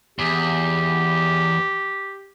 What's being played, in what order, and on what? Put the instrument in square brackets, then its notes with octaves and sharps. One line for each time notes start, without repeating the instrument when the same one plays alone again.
[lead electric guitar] E2 [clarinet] G4